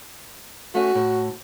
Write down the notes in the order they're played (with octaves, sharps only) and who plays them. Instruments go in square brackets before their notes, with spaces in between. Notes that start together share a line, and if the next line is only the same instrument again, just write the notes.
[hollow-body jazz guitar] A3 C#4 [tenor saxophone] F#4
[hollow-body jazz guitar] A2